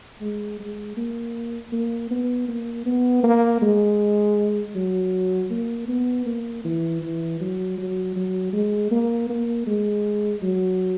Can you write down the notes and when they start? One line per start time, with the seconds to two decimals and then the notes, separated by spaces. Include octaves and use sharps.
0.21 G#3
0.60 G#3
0.97 A#3
1.72 A#3
2.11 B3
2.48 A#3
2.86 B3
3.24 A#3
3.62 G#3
4.75 F#3
5.50 A#3
5.88 B3
6.26 A#3
6.64 E3
7.02 E3
7.41 F#3
7.78 F#3
8.16 F#3
8.53 G#3
8.91 A#3
9.29 A#3
9.67 G#3
10.42 F#3